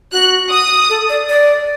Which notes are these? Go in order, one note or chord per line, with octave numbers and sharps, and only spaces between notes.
F#4 F#6
D#6
A4
D5
D5